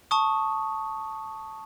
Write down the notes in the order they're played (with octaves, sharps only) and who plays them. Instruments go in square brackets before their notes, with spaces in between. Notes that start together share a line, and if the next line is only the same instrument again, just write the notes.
[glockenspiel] A5 C#6 D#6